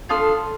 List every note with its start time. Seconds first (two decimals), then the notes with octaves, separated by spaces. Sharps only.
0.09 D4 F4 A4 D#6 F6